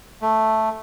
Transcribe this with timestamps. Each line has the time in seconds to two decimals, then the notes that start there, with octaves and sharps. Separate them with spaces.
0.22 A3